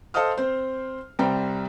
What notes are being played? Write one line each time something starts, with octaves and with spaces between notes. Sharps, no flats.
A4 C5 D#5 F5 D#6 F6
C4 C5
C2 G3 C4 G5 A#5